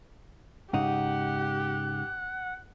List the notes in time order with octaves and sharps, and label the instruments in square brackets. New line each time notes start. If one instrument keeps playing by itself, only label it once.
[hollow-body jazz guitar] G#2 C#3 D#4 [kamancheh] G4 [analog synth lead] F#5